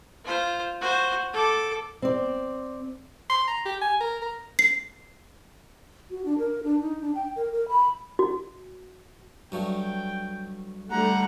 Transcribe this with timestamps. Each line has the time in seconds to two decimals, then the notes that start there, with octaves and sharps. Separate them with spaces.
0.24 F4 C5
0.81 F#4 C5
1.33 A4 D6
2.02 C4 D5
3.30 C6
3.48 A#5
3.66 G4
3.81 G#5
4.00 A#4
4.22 A#4
4.59 C7
6.10 F#4
6.25 D4
6.39 A#4
6.63 D4
6.81 D#4
7.01 D4
7.15 G5
7.36 A#4
7.52 A#4
7.68 B5
8.19 F#4
9.52 G2 F#3 A3 G5
10.91 D3 G3 A3 F#5 A#5